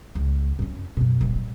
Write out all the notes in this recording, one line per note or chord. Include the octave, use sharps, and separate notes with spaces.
C#2
F#2 C#4
F#2 B2
D#1 A#1
G3